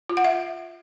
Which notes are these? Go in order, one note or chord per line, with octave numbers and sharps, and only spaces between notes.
F4
F#5
E5